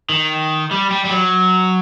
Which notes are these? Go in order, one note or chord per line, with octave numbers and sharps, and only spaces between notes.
D#3
G3
G3
G3
F#3